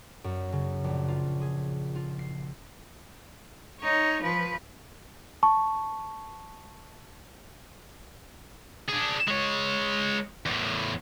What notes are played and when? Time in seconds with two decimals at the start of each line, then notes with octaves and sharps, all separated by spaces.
0.24 F#2
0.53 C#3
0.84 A#1
1.08 F4
1.41 G#4
1.96 F4
2.19 C7
3.81 D#4 C#5
4.22 F3 B4
5.43 A5 C#6
8.88 D4 G#4
9.28 G#3 C#5
10.46 E2 A2